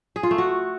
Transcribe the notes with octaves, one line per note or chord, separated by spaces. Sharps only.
G#4
F4
A3
F#4